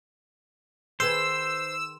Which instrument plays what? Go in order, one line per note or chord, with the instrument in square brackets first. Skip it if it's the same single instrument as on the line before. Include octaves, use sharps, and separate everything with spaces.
[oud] D#3 G#4 B4 [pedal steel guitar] C5 [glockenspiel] C6 E7 [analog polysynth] E6